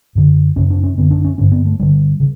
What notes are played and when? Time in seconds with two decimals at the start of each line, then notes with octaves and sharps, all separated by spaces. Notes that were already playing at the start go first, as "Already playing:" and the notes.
0.15 F#2 D3
0.56 F#2 C#3 C#4
0.70 D4
0.83 C#4
0.97 F#2 D3 B3
1.11 D4
1.24 C#4
1.38 G2 D3 C#4
1.52 B3
1.66 A3
1.79 G2 D3 G3
2.20 C#3